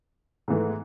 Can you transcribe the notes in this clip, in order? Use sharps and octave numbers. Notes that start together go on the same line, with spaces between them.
G#2 E3 A3